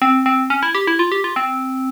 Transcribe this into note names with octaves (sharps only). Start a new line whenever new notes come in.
C4
C4
C#4
E4
G4
E4
F4
G4
F4
C4